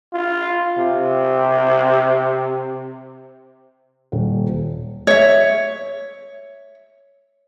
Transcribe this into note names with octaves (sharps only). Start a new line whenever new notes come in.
F4
C3
D#1
C#5 E5